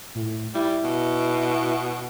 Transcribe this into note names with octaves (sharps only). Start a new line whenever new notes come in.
A2
G3 E4
B2